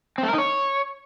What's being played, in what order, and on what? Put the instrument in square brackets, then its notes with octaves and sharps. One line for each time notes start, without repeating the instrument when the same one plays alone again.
[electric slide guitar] C4
A3
A#4
D#4
C#5